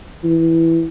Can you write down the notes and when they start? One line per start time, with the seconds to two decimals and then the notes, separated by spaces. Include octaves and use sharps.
0.24 E3